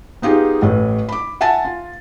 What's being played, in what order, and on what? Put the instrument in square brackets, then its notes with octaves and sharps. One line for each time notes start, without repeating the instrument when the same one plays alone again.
[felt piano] B3 D#4 F4 G4 G#4
A1 A2 B4
B5 D6
E5 F#5 G#5 A5 A6
F4